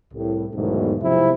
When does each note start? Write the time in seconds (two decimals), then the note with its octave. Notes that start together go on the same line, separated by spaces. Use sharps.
0.13 C2 A2
0.54 B1 E2 G#2 B2 D#3 A3
1.02 B1 F2 C3 F3 C4 E4